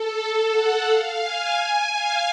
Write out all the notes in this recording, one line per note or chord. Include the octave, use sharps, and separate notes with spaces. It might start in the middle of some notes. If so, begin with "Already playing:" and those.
Already playing: A4
F#5
F5
G#5
G#5
F5